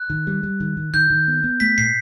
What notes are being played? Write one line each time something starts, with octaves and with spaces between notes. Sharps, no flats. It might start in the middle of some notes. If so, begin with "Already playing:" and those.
Already playing: F#6
D#3
G3
G3
D#3
D#3
D#3 G6
D#3
B3
B3
A3 B6
A#2 C7